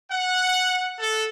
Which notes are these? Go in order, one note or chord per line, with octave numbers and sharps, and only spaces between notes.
F#5
A4